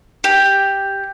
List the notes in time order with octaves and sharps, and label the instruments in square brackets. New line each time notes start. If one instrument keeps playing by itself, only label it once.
[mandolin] G4